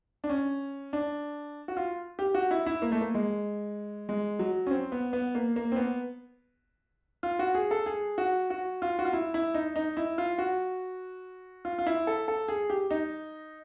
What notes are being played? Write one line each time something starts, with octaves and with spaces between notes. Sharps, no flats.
D4
C#4
D4
F#4
F4
G4
F#4
E4
E4
A#3
A3
A#3
G#3
G#3
F#3
C#4
C4
B3
B3
A#3
A#3
C4
B3
F4
F#4
G#4
A4
G#4
F#4
F#4
F4
F#4
F4
E4
E4
D#4
D#4
E4
F4
F#4
F4
F4
E4
A4
A4
G#4
G4
D#4